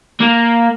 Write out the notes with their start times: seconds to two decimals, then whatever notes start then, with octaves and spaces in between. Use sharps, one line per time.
0.21 A#3